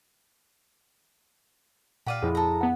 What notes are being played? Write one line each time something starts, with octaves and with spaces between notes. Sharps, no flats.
A#2 G4 D5 F5 F#5 D#7
F2 F3 E4 G#4
A4 E5 A#5
G2 B3 F#5